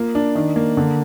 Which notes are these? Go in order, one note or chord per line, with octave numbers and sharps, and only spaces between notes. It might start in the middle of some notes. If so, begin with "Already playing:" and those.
Already playing: A#3 F4
D4
D#3
A#3
D3